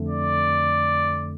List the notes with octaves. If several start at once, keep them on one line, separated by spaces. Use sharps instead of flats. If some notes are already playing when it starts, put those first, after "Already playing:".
Already playing: F2 D3 A3
D5